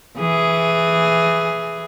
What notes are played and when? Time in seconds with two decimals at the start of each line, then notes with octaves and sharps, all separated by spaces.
0.18 E3 G#4